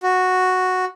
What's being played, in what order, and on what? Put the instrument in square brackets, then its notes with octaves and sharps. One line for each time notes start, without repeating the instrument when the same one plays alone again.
[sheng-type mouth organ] F#4